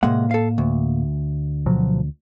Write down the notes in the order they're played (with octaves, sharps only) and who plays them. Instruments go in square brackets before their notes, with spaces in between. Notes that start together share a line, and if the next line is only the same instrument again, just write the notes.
[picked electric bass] A2 A#3 [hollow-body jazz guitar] C3 G#3 F#5
[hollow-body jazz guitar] A4 F5
D2
[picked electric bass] B2 F3 F#3